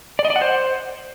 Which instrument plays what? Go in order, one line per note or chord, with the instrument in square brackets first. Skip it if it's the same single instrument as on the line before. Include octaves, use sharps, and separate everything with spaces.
[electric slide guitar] D5
D#5
D5
F#5
C5